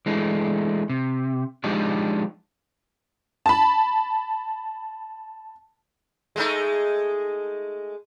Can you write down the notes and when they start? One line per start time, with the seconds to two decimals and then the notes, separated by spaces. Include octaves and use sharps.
0.06 E3 G#3 A3 D4
0.89 C3
1.64 F3 G#3 D4 D#4 G4
3.46 A5 B5
6.36 G#3 A3 D#4